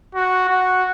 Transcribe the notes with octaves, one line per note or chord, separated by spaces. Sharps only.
F#4
F#4